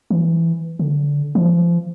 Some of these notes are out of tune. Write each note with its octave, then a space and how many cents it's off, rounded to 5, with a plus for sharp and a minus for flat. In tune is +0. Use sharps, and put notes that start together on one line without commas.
E3 +10
D3 -20
F3 -30